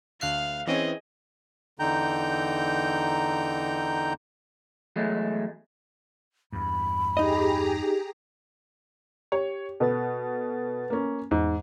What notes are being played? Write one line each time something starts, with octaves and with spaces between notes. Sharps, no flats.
D2 F5 F#6 C7
E3 C4 C#4 G#4 D#5
E2 D3 D#4 G5 A#5 G6
E2 F#3 G#3 A3
E2 G2 B5
D#4 G4 G#4 D#5 A#5
G4 C#5
B2 A4 B4 A6
A#3 C#4
E2 G#2